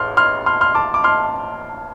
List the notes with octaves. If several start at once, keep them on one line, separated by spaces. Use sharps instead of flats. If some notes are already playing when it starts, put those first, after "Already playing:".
Already playing: A1 C6 F6
C6 F6
C6 F6
C6 F6
A5 D6
D6
C6 F6